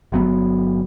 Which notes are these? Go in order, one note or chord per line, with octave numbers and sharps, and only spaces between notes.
G1 F#3 B3